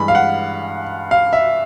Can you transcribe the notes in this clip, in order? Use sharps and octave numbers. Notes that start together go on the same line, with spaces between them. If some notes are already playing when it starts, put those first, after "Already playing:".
Already playing: G2 E3 G#3 B5
F5
F#5
F5
E5